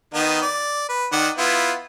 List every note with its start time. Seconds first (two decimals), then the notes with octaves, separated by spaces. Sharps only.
0.14 D#3 B3 D#4
0.42 D5
0.89 B4
1.12 D#3 D5 F#5
1.38 B3 E4 F4